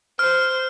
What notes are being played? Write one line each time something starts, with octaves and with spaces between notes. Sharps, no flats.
C5 F6